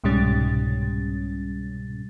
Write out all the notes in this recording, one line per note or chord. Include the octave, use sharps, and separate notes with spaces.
C2 G#2 B2 G3 C#4 A6